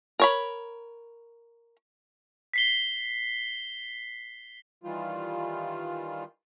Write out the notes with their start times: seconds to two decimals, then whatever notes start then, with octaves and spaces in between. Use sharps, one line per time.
0.20 A#4 C#5 B5
2.54 B6 C7 G7
4.84 D#3 E3 G3 F4